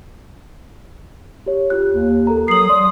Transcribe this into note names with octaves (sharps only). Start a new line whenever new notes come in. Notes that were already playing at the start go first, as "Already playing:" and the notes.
G4 C#5
F4 G4 F#6
D#2
A4 A#4 A#5
F#3 D#6 C7 F#7
F#3 D5 C6